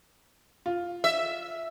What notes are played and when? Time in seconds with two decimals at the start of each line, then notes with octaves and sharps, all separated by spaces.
0.66 F4
1.04 E5